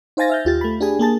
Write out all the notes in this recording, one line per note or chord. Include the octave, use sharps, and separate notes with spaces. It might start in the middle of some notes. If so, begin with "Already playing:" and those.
D#4 C5 F5 G#5 A6 A#6
E5 F6 G6
D#2 F4 G4 A6
A3 B5
D4 G4 G#4 G#5
A#3 G#4 A5 A6